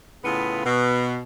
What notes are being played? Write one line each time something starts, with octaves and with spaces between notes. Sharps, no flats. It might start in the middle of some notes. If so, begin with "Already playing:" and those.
A2 C#3 B3 F4 G#4 B4
B2